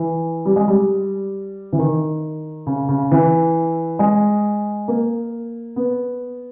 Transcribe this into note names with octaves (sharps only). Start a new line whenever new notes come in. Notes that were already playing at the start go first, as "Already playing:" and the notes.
Already playing: E3
G3
G#3
G3
E3
D#3
C#3
C#3
E3
G#3
A#3
B3